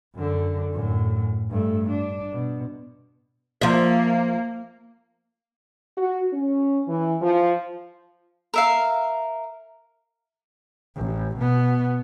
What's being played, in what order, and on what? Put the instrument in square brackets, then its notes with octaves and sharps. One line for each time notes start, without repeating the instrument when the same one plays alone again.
[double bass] F#2 D3
F#2 A2
G2 A3
D4
B2
[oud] F3 E5 [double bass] A#3
[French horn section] F#4
C#4
E3
F3
[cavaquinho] A#4 E5 F5
[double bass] A1
B2 B3